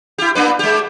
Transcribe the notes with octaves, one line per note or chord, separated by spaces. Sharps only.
E4 G4
A#3 D4 B4
G#3 G4